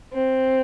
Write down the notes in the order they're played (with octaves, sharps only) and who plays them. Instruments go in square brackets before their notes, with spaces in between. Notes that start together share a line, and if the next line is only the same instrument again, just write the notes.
[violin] C4